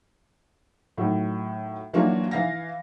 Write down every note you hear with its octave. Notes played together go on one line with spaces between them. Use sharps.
A2 D#3 F#3
E3 F#3 A#3 D4 F4 F#4
E3 F5 A#6